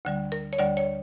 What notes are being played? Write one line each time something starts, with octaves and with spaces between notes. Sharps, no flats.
D2 D3 G3
A#4
C#5
D2 D3 G3 D5
C#5